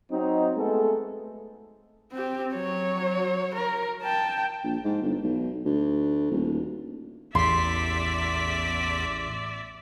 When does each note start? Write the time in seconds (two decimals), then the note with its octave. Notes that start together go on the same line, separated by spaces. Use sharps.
0.11 F#3 C4 D#4
0.57 G#3 A3 B3 A4
2.13 C4 G4
2.54 F#3 C#5
3.55 A#4
4.03 G5 A5
4.64 A#1
4.84 G#2
5.02 G1
5.23 B1
5.65 D2
6.31 D#1
7.35 A1 E2 D5 E5 C6 B6